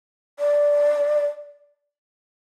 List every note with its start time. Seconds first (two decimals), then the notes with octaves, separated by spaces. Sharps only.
0.39 D5